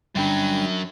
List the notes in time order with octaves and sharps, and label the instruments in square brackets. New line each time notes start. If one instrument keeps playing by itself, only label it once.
[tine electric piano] G1 G5 B5 [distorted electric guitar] F#2 F#3 [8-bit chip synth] G3 D4